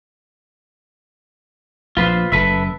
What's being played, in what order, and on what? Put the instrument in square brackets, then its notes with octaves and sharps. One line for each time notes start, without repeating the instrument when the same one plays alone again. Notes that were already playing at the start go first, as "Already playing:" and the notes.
[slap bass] A#1 [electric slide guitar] F4 B4 C5
[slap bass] F#1 [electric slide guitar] A4 B4 E5